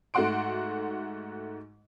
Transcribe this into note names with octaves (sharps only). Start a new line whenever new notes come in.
G#2 A3 F#4 F#5 C6 D7